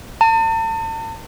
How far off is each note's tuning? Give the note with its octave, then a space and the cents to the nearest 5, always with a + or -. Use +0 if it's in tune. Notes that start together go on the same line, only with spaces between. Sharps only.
A5 +40